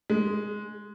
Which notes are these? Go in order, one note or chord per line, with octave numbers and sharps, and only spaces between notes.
G#3